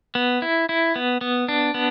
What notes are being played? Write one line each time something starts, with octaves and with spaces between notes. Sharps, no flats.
B3
E4
E4
B3
B3
D4
B3